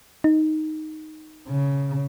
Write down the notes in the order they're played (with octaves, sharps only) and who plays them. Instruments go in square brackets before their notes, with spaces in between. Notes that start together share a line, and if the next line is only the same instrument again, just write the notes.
[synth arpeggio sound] D#4
[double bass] C#3